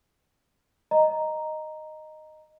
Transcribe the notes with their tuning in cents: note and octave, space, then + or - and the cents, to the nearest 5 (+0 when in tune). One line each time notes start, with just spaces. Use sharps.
D#5 -5 A#5 +0